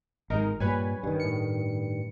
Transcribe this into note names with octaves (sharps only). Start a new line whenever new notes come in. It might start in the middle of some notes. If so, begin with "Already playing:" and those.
G#1 G#3 D#4 A#4 D#5
G2 A#2 G3 B4 C#5 G#5
G2 D#3
A2 C#7